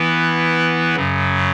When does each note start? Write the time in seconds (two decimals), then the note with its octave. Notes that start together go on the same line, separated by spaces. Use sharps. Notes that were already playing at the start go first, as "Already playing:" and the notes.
Already playing: E3 B3 E4 B4
0.96 F#2 C#3 F#3